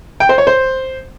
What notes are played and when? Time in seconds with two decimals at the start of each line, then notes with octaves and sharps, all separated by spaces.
0.20 G5
0.29 C5
0.38 C#5
0.47 C5